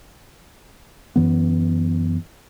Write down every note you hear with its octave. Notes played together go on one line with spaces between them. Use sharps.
F#2 E3 B3